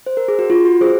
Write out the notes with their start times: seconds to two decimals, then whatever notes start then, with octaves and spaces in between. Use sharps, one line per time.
0.06 C5
0.17 A#4
0.28 G#4
0.39 F#4
0.50 F4
0.65 F#4
0.81 G#4 C5